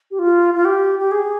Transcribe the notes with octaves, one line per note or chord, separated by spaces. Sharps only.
G4
F4
F4
G4
G4
G#4